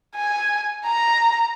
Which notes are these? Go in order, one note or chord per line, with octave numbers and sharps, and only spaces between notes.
G#5
A#5